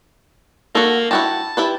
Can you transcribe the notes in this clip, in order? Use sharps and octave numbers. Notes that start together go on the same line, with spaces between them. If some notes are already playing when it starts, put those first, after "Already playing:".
A#3 F#4 A4
E4 F#4 G4 A5
E4 G4 B4